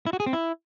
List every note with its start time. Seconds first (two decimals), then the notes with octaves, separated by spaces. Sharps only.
0.06 E4
0.13 F#4
0.20 G#4
0.26 C4
0.33 E4